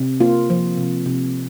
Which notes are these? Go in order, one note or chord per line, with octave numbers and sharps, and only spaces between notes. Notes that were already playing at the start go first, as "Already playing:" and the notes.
Already playing: C3
A#3 F4
F3
C3
C3